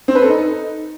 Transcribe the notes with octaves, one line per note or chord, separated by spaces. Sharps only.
C4
B4
A4
D#4